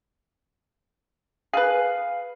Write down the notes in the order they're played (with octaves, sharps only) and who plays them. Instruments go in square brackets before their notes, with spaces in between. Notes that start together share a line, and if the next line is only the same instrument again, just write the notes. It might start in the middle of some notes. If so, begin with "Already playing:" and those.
[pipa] G#4 B4 [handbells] F5